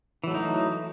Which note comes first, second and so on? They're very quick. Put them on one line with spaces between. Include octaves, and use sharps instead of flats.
E3 F#3 A3 D#4